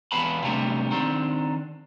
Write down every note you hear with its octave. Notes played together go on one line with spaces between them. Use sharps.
E2 B3 B4 F5 A5 B5
C3 F#3 G3 A3 B3 D4
D#3 C4 D4